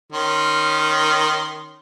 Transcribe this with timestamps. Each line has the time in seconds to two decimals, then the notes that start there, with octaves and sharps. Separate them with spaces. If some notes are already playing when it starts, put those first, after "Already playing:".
0.13 D#3 C#4 C6